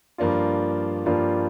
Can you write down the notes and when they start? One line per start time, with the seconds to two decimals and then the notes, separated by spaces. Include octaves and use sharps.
0.18 G2 F3 A#3 D4 F4
1.06 G2 F3 A#3 D4 F4